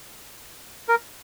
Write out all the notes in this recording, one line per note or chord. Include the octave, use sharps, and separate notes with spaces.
A#4